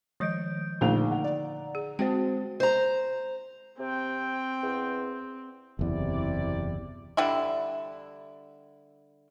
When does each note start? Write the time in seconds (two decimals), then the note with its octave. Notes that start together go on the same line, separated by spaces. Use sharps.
0.20 D#3 F3 G#3 D#5 G6 D7
0.81 A#1 D3 A3 A#3 D#4 A#5 F7
1.11 F#5
1.24 D5
1.75 G#4
1.99 G#3 C4 F#4 C5 G5
2.60 C5 A#5
3.79 C3 C4 G5
4.63 E2
5.79 F#1 E2 C3 E4 D5
7.17 D3 G3 D4 E4